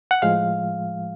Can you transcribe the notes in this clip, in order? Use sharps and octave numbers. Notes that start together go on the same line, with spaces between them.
F#5
A2 F3 G#3 F5